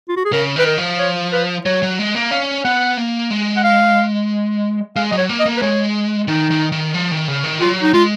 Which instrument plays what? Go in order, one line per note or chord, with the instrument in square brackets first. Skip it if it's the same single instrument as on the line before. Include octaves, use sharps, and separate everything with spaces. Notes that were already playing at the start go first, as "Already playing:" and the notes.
[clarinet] F4
F#4
G#4
[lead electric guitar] C#3 [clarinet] A#4
[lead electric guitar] D#3 [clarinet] B4
[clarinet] A#4
[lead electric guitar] F3
[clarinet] C#5
B4
[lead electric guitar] F#3 [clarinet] C#5
[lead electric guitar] F#3
G#3
A#3
[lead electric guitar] C#4 [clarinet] F5
[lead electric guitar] B3 [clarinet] F#5
[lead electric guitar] A#3
G#3
[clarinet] F#5
F5
[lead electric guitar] G#3 [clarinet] F5
[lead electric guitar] F#3 [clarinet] D#5
[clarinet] C#5
[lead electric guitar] A#3
[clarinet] D#5
[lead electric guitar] A#3
[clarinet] B4
[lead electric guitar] G#3 [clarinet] C#5
[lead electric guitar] D#3 [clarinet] D#4
[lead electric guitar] D#3
D#3
F3
D#3
C#3
D#3
[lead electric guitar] F#3 [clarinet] F4
[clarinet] D#4
[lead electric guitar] G#3 [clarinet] F4